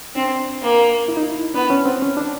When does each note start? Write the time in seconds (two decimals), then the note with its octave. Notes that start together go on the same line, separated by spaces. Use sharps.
0.15 C4 D4
0.61 A#3
1.08 E4
1.17 D#4
1.23 E4
1.54 B3 D4
1.70 C#4
1.85 C4
2.02 C#4
2.17 D4